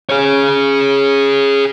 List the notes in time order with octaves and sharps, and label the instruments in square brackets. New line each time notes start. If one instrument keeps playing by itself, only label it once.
[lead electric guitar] G#4 C#5